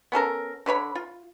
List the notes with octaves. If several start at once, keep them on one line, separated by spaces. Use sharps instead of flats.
B3 C#4 A4 A#4
D3 B4 C#5 B5
F4